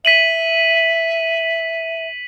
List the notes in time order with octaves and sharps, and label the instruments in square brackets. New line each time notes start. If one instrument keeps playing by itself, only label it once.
[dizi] E5 [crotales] B6 D#7 F#7